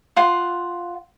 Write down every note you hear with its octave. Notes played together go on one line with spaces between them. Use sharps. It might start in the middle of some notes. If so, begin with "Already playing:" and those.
F4 F5 F#5 C6